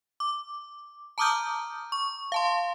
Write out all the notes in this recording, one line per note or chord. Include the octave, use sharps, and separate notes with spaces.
D6
A5 A#5 D6 D#6 F6 G6
C#6
F5 A5 C6